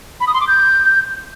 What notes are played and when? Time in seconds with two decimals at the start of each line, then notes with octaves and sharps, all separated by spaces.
0.20 B5
0.27 D#6
0.34 C6
0.41 D6
0.48 G6